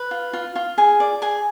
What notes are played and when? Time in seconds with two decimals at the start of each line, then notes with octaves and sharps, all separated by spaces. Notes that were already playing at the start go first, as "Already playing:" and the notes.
Already playing: B4
0.11 F4
0.33 F4
0.56 F4
0.78 G#4 G#5
1.00 D5
1.22 G#4 G#5